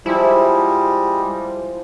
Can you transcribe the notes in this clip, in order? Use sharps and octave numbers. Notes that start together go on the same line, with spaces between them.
F3 G3 G#3 E4